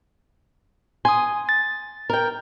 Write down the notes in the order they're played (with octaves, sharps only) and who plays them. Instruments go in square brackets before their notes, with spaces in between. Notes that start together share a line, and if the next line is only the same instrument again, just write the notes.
[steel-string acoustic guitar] G#5 [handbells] C6 D#6
[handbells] A6
[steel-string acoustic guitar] A#4 G5